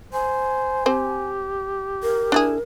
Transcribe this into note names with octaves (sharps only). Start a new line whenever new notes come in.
C5 G#5
C4 G4 C5
A#4
D4 E4 G#4